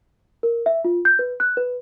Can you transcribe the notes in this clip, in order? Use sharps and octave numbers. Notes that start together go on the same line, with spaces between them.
A#4
E5
F4
G6
B4
F#6
B4